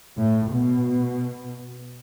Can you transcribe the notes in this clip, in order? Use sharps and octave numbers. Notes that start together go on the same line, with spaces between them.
A2
B2